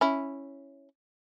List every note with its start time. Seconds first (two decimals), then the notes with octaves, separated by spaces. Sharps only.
0.01 C#4 E4